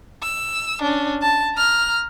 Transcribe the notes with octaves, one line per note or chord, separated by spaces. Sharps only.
E6
C#4 D4
A5
A#5 F6